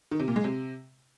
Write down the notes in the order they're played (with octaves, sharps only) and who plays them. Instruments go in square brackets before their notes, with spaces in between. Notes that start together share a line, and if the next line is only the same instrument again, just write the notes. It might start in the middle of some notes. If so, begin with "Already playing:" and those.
[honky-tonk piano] D#3
C3
A#2
G#3
C3